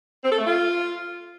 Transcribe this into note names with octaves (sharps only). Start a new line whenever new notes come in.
C4
A4
A3
F4